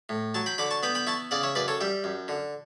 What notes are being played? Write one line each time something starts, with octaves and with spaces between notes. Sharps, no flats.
A2
F#3 A5 C#6
G5 B5
D3 B5 D6
A5 C#6
B3 G5 B5
G5 B5
E4 A5 C#6
C#3 D5 F#5
C#5 E5
F#2 B4 D5
A4 C#5
G3 E5 G5
F#2
D3